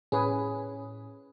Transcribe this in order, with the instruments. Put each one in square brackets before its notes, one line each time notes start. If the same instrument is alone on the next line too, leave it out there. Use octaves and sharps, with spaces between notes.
[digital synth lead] A2 [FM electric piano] C#4 [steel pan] G#4 B4